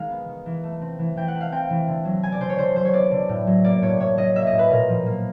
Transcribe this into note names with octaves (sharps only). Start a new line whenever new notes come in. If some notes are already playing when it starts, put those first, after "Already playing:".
Already playing: D#3 G#3 F5
B3
D#3
E3
A3
C4
E3
E3 G5
F#5
A3
F5
C4 G5
E3
D3
F#3
B3 G#5
D5
D3 C5
C#5
D3 C5
F#3 C5
C#5
B3 D5
D3
A2
F#3
A#3 D5
A2 C#5
A2 C#5
F#3 D#5
A#3 E5
D#5
A2
B4
A#2 A#4
F3
A#3